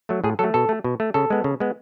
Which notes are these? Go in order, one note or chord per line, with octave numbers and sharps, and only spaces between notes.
F#3 A3
A2 G#4
F#3 A3 A4
B2 A4
A3
B2
A3
C#3 A4
G#3 B3
C#3
G#3 B3